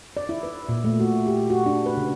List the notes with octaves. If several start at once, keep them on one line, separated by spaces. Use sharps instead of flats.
D5
E4
B4
A#2
A3
F#4
G4
F#4
D4
B4
C#3